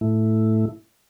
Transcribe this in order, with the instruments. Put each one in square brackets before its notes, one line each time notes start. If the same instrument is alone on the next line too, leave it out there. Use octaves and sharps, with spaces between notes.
[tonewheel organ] A2 A3 E4